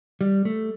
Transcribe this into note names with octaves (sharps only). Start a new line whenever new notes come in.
G3
A3